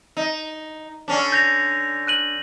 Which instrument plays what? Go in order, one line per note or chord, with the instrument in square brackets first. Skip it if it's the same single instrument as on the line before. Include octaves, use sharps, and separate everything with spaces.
[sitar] D#4
D3 C#4 D4
[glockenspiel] G6 A#6 F7
F#6 D#7 F#7